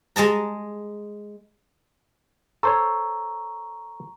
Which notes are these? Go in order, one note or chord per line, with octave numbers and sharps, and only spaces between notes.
G#3 D#5 A5 A#5
A4 C5 C#5 A#5 C#6